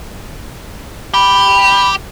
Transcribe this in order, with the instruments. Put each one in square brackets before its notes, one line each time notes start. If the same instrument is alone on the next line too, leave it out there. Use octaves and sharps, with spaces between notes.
[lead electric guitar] G4 [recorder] B5